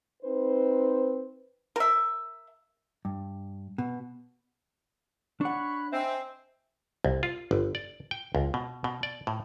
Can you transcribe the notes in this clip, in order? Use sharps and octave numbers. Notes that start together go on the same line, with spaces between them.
C4 D#4 B4 C5
A#4 E5
G2
B2
D4 C#5 F#5 B5 C#6 F#6
C4 D#5 E5 G#5
C2
F4
G1
D5
G5
C#2
B2
B2
D5
A2